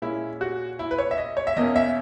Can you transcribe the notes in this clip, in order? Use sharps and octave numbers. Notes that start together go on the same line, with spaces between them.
A#2 G#3 C#4 E4
F#4
E4
B4
C#5
E5
D#5
C#5
E5
E2 B2 A#3 C#4 D#5
E5